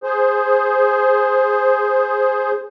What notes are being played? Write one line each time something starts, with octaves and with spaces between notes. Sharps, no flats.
G#4 C5